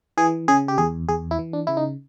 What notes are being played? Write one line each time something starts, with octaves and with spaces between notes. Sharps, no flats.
E3 G#4
C#3 G#4
G4
E2 G#4
E2 G#4
E4
E3
D4
C#3 E4
D#4